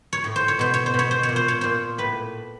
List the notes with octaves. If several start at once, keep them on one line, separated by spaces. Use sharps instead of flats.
C#5
A2
C5
C#5
B2 C5
C#5
C5
B2
C#5
C5
C#5
A#2
C5
C#5
A#2 C5
A2 B4